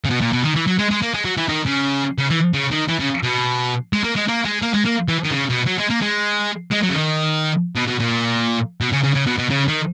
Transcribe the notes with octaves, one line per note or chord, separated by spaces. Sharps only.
C#3
B2
A#2
B2
D#3
E3
F#3
G#3
G#3
A#3
G#3
F#3
E3
D#3
C#3
C#3
E3
C#3
D#3
E3
C#3
B2
G#3
A#3
G#3
A#3
G#3
A#3
G#3
A#3
E3
D#3
C#3
B2
F#3
G#3
A#3
G#3
G#3
F#3
C#3
D#3
B2
B2
A#2
B2
C#3
C#3
C#3
B2
B2
C#3
D#3